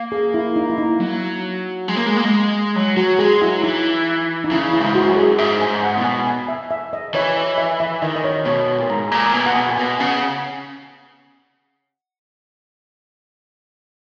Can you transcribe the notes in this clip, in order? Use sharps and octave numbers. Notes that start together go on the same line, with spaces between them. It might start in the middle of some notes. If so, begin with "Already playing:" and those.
Already playing: A#3
G#4
E4
D#4
E4
D#4
F#3
G#3
A#3
G#3
A#3
G#3
F#3
F#3 F#4
G#3 G#4
F#3 E4
E3 D#4
D#4
C#3 E4
E4
G#2
F#4
F#2
G#4
G#2 E5
G#5
G#2
F#5
B2
G#5
G#5
E5
E5
D#5
E3 C#5
D#5
E5
E5
D#3 D#5
D#5
C#5
B2 C#5
A#2
G#2 A#5
A#2 A#5
B2 G#5
F#5
B2 G#5
A#2
B2 G#5
C#3 F#5